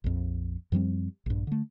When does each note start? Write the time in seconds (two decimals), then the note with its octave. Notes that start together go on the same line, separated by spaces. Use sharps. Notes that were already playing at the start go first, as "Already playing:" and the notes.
0.04 A#1 F2
0.72 F#2 F3 G3 C4
1.26 A#1 G2
1.47 D3 A3